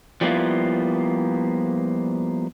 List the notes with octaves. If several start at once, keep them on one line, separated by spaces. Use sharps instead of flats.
F3 G3 A#3 B3 E4 F4